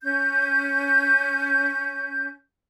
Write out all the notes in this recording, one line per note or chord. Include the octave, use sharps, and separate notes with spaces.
C#4 G6